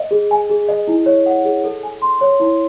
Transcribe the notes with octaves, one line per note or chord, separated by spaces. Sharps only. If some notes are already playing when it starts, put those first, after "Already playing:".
Already playing: D#5
G#4
G#5
G#4
D#5
E4
C#5
F#5
G#4
A4
G#5
C6
C#5
E4